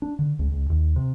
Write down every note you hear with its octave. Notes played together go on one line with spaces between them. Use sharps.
D4
D3
C#2
C#2
D#2
C3